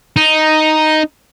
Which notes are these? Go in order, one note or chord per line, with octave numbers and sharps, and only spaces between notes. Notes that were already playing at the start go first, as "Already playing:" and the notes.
D#4